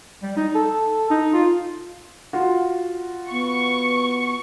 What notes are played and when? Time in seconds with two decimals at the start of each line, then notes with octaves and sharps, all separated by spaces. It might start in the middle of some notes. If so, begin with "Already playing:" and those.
0.23 G3
0.37 D#4
0.55 A4
1.10 D#4
1.33 F4
2.33 F4 F#4
3.31 B3 C#6